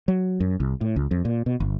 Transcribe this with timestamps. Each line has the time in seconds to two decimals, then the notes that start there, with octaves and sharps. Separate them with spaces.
0.08 F#3
0.40 F#2
0.60 C2
0.81 A2
0.96 C#2
1.11 F2
1.25 A#2
1.46 B2
1.60 G1